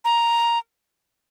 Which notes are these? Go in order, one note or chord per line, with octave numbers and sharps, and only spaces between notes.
A#5